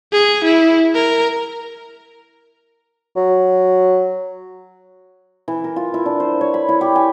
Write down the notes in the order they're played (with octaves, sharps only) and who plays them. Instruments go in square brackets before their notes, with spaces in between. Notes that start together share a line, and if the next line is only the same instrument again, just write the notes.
[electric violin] G#4
E4
A#4
[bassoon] F#3
[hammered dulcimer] E3
A#4
F4
E4
D4
C5
C#5
B5
E4
G4
G#5